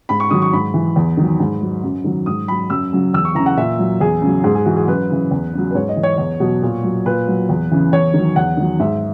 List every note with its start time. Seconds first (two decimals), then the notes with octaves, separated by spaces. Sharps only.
0.09 G#2 B5
0.20 C#6
0.30 D#3 F#3 D#6
0.42 C#6
0.53 G#2 B5
0.74 E3
0.96 E2
1.17 D#3 F#3
1.40 G#2
1.62 F#3
1.84 F#2
2.04 D#3 F#3
2.26 G#2 D#6
2.48 F#3 B5
2.70 F#2 E6
2.93 C#3 F#3
3.14 E2 E6
3.25 C#6
3.35 E3 A#5
3.39 C#3
3.46 F#5
3.57 A#2 E5
3.79 F#3
4.00 E2 G#4
4.22 C#3 F#3
4.44 G#2 G#4
4.55 G#4
4.66 E3 F#4
4.76 G#4
4.88 F#2 B4
5.10 C#3 E3
5.31 E2
5.54 C#3 F#3
5.71 B4
5.75 G#2 C#5
5.89 D#5
5.97 E3
6.03 C#5
6.18 E2 C#5
6.40 B2 F#3
6.62 A#2
6.83 F#3
7.06 A#2 B4
7.28 F#3
7.49 E2
7.71 C#3 E3
7.92 E2 C#5
8.14 D#3 F#3
8.36 E2 F#5
8.57 D#3 F#3
8.79 G#2 E5